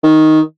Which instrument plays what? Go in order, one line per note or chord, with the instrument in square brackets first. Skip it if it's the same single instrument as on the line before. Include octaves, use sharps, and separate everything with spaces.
[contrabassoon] D#3